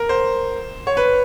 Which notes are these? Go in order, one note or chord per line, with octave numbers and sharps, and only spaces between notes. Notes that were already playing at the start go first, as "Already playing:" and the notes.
Already playing: A#4
C5
C#5
B4